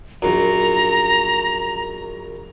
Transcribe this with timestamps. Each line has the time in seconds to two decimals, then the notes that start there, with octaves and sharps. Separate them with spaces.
0.22 A#1 F#2 A#5